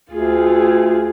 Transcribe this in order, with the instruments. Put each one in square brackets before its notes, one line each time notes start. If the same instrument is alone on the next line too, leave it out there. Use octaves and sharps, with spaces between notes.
[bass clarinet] D2 [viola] F4 G#4